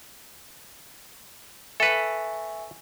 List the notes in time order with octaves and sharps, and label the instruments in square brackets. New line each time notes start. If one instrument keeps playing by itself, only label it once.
[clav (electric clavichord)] A4 B4 [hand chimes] E5 G#5 C#6